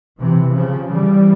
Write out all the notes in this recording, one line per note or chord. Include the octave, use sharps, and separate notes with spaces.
C3 E3
C#3 F3
E3 G3